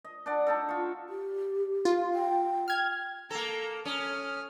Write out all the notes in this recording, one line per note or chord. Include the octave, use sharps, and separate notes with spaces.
D#5
D4 D5 F#5
D4 D#4 A4
F4 C#6
G4
F4
G5
F6 G#6
A#3 A4 A#5
C#4 D#6 F6